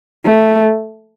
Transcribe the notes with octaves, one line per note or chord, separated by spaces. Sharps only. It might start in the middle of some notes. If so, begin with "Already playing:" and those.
A3